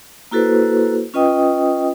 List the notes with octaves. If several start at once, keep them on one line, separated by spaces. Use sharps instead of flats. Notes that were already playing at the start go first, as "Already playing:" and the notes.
A#3 E4 F#4 A4 B4 C5
C#4 F4 B4 D#5 G5 D#6